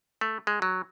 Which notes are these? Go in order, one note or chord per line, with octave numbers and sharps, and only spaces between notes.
A3
G#3
F#3